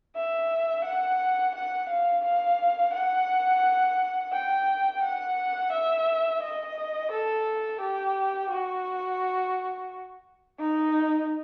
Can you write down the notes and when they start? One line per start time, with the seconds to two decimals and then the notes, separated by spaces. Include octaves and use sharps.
0.16 E5
0.85 F#5
1.55 F#5
1.89 F5
2.25 F5
2.94 F#5
4.33 G5
5.03 F#5
5.73 E5
6.43 D#5
7.12 A4
7.81 G4
8.50 F#4
10.59 D#4